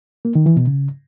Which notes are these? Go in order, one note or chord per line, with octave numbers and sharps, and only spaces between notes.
A#3
D#3
E3
B2
C#3